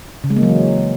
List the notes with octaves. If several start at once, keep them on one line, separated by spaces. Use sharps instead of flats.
C#3
G#3
A#3
F#3
E3